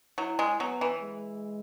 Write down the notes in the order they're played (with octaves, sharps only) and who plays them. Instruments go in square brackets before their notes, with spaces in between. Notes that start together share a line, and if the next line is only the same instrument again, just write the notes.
[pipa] F#3 [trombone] E4
[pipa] G#3
[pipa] F#3 [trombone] B3
[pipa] E3
[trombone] G#3